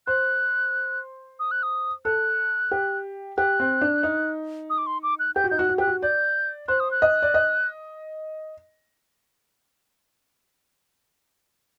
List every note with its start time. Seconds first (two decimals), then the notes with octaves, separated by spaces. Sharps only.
0.07 C5 F#6
1.40 D#6
1.51 F#6
1.63 D#6
2.05 A4 F#6
2.71 G4
3.38 G4 F#6
3.60 C4
3.82 D4
4.03 D#4
4.70 D#6
4.78 D6
4.87 C6
5.03 D6
5.19 F#6
5.36 G4 G6
5.44 F#4
5.50 D#4 G6
5.58 F#4 F#6
5.69 F#4
5.78 G4 F#6
5.88 F#4
6.02 D5 G6
6.68 C5 F#6
6.80 D#6
6.91 F#6
7.02 D#5
7.22 D5
7.34 D#5